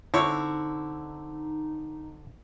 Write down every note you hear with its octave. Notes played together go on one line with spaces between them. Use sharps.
D3 C4 D#4 E4 C#5